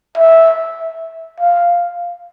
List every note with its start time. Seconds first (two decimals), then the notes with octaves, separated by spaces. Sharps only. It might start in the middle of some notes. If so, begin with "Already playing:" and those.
0.17 E5
1.40 F5